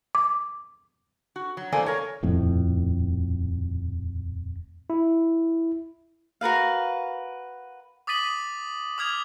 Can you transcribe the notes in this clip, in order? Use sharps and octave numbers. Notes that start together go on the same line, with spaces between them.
D6
F#4
F#3
E2 A#3 A4 C5 D5 G#5
A#4 C#5
D#1 F2 A2
E4
F#4 A#4 B4 F5
D6 D#6 A6 B6 D#7 F#7
D6 D#6 F6 G#6 F7